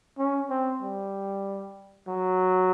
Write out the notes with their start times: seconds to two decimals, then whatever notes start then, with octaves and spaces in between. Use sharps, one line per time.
0.19 C#4
0.50 C4
0.82 G3
2.08 F#3